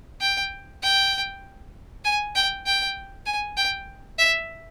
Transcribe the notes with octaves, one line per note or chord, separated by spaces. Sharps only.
G5
G5
G#5
G5
G5
G#5
G5
E5